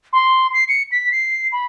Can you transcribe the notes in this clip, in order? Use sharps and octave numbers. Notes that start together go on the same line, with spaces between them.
C6
C7
C#7
B6
C7
B5